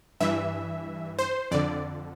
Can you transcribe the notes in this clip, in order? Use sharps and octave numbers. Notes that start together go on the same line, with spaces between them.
G2 E3 E5
C5
F2 D3 D5